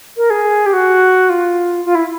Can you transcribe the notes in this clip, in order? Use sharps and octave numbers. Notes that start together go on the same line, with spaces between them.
A#4
G#4
G4
F#4
F4
F4
E4